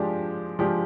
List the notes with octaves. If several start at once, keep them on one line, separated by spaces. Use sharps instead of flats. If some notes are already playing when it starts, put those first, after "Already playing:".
Already playing: F3 G#3 D4 G4
F3 G#3 D4 G4